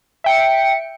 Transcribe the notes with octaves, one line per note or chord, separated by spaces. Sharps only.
E5 G5 C#7